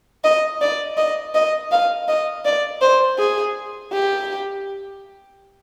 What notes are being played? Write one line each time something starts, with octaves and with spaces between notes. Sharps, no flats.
D#5
D5
D#5
D#5
F5
D#5
D5
C5
G#4
G4